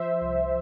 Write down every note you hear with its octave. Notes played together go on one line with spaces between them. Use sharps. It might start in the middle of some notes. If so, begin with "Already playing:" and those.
Already playing: F3 C5 E5
C2